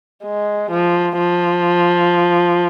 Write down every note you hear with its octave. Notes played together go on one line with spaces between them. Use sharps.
G#3
F3
F3